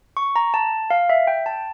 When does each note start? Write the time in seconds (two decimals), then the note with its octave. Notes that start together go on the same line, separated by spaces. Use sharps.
0.17 C#6
0.36 A#5
0.54 A5
0.90 F5
1.09 E5
1.27 G5
1.46 A5